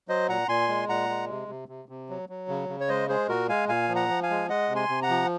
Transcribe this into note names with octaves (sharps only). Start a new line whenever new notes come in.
F#3 C5 D#5
A#2 F#5 A#5
A#2 G#5 C6
G#3
A#2 F#5 A#5
G#3
C3
C3
C3
C3
F#3
F#3
C#3
C#3
C#5
G#3 C5 D#5
G#3 G#4 C5
A#2 F#4 A#4
G#3 F5 G#5
A#2 F5 G#5
F3
F#5 A#5
F3
F5 G#5
G#3
G#3 D#5 F#5
C3
G#5 C6
C3
F#5 A#5
F3